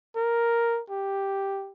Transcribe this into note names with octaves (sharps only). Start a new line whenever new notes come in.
A#4
G4